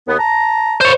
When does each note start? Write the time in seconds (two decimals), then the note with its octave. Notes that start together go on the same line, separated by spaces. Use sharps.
0.07 D#2 B3
0.18 A5 A#5
0.81 C5 C#5